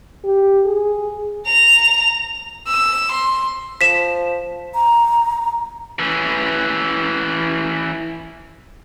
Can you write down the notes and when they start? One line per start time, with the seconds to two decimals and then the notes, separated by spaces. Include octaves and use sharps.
0.25 G4
0.65 G#4
1.47 A#5 F7
2.68 E6
3.11 C6
3.81 F3 B6 E7
4.74 A#5
5.99 E3 C#4